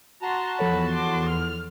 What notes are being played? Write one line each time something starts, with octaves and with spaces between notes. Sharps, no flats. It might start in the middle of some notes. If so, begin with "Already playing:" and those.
F#4 A5 A#5 C6
E2 F3 A4 C#5 B5
C6 D6
F6